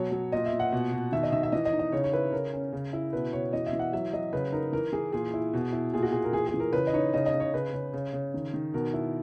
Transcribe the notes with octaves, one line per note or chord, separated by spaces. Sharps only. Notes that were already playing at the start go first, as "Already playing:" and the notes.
Already playing: B2 F#3 C#5
F#3
A#2 D#5
E5
A#2
F#5
B2
B2
D#3 E5
D#5
D#3 E5
E5
E3 D#5
D#5
D#4
D#5
C#3 C#5
C#5
E4 B4
C#3 A#4
C#4
C#3
E4
B2 B4
B2 C#5
E3 D#5
E5
E3
F#5
F#3 E5
F#3 D#5
C#3 B4
D#4 A#4
E3 A#4
E3 G#4
A#2 G#4
E4
B2
E4
A#2 G#4
F#4
A#2 G#4
A#4
E3 G#4
G#4
E3
A#4
C#3 B4
D#5
D#4 C#5
C#3 D#5
D#5
C#3
C#5
C#3 B4
C#3
C#3
C#3
D#3
D#3
B2 A#4
E4